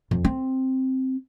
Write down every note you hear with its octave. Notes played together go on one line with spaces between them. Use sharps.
F2
C4